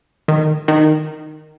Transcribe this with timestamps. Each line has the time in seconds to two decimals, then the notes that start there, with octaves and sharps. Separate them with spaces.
0.28 D#3
0.68 D#3